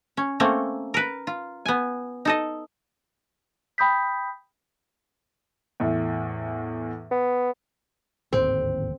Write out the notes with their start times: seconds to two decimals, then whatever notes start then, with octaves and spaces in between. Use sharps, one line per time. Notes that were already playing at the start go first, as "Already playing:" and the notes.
0.17 C#4
0.40 A3 A#3 C4 C#4
0.94 A#4 B4
1.27 F4
1.66 B3 G#5
2.25 D#4 A4 D#5
3.78 G5 B5 D#6 G6 B6
5.80 E2 A2
7.11 B3
8.33 D1 G#1 D#2 C4